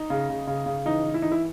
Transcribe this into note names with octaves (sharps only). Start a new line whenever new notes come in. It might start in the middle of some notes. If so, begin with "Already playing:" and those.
Already playing: D#4
C#3
C#3
C#3
C#3
E3 D#4
E3
E4
E3 D#4
E4